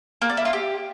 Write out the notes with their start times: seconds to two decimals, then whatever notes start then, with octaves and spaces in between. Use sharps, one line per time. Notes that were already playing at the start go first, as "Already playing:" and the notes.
0.22 A#3
0.29 D5
0.37 E4
0.45 F4
0.53 G4